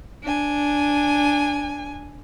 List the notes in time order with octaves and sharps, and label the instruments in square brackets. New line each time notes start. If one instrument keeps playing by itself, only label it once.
[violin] D4 G#5